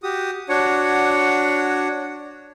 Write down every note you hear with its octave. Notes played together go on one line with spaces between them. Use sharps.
F#4 G4 D#6
D4 F#4 C#5 F#5